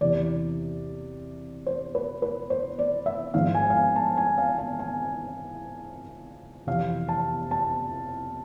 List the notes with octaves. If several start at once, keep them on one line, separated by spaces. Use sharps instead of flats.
E2 C3 E3 D5
C5
B4
B4
C5
D5
E5
G#1 G#2 F3 G#3 F5
G#5
F5
G#5
A5
G#5
F5
G#5
G#5
F2 C3 E3 F5
A5
A5